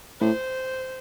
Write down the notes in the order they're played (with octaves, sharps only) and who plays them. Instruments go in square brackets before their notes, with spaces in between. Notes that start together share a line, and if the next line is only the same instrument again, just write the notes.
[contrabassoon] A2 [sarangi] C5